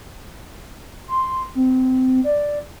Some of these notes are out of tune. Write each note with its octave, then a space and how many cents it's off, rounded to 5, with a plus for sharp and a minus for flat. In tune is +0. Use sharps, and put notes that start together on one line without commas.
C6 +0
C4 -25
D5 +0